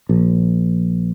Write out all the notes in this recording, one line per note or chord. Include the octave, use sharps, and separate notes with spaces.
A#1